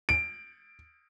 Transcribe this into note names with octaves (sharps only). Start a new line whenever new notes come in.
D7